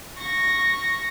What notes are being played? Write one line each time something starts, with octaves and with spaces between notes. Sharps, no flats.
C#6 A#6